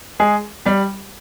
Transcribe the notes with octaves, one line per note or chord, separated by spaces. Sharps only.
G#3 G#4
G3 G4